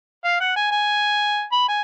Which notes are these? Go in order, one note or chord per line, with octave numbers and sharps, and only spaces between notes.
F5
F#5
G#5
G#5
B5
G#5